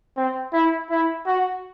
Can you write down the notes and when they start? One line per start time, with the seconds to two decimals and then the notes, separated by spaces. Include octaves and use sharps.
0.17 C4
0.53 E4
0.90 E4
1.27 F#4